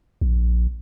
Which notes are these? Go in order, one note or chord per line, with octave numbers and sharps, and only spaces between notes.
A#1